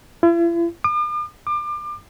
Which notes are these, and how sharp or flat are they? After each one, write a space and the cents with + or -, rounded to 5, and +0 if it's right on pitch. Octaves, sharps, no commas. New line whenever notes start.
E4 +45
D6 +45
D6 +30